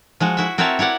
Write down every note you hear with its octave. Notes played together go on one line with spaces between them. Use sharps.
F3 G#3 F#4
E4 F#4 E5
C4 F#4 A#4 C#5 E5 A5
E4 C#5 D5 F#5